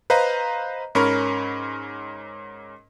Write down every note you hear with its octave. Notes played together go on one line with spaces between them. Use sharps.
B4 C5 D#5 F5 A#5
G#2 C#4 A#4 B5 C#6